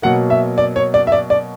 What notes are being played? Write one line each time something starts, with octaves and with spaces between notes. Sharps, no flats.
B2 F#3 A#3 F#5
E5
D5
C#5
D5
E5
D5
D5